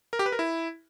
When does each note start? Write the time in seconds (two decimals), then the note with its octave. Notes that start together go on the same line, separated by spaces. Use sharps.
0.13 A#4
0.19 G4
0.26 B4
0.32 A#4
0.39 E4